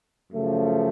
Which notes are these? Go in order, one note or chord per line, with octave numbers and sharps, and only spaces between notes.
F#2 C#3 F3 A3